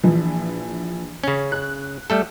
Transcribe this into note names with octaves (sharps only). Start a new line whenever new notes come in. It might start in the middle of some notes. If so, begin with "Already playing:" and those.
A#1 E3 F3
C#3 C#4
F#6
G3 A3 A4